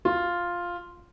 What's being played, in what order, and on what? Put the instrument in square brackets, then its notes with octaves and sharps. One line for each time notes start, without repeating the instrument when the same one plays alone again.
[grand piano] F4